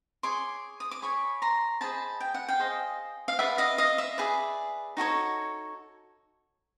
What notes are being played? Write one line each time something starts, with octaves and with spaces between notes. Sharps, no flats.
G#4 C#5 C6 D6
D#6
D6
G#4 C#5 B5 C#6
A#5 C6
G#4 C5 D#5 A5 B5
G5
F#5
F5 G5
G#4 C5 D#5
F5
G#4 B4 D5 E5 F#5
D#5 F5
D#5 F5
E5
G#4 B4 D5
D#4 F#4 A4 C#5